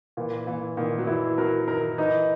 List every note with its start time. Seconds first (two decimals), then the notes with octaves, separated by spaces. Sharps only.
0.17 A#2 E3
0.47 A#2 E3
0.77 A#2 D#3
0.98 F#3
1.07 E3 E4
1.38 F#3 A#4
1.67 D#3 A#4
1.98 E3 D#4